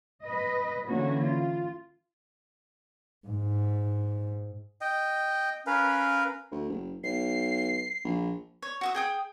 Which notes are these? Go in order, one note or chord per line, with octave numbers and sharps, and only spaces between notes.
B4 D#5
D3 E3 A#3 C#4 F#4
F4
G#2
D#5 G5
C#4 A#4 B4 F5
D2
F#1
B1 C7
A#1
C#5
F#4 E5 D#6
G#4 G5 D#6